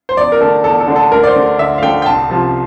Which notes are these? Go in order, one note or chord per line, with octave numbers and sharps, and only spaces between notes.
C5
E2 D5
A#4
D3 A3 D4 A4
E2 A4
A4
D3 A3 D4
A4
D2 A#4
D5
C5
D3 A3
D2 E5
F5
D3 A3 G5
G5
C2 A5
C3 F3